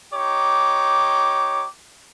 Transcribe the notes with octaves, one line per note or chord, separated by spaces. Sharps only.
D#4 G4 C#5 D6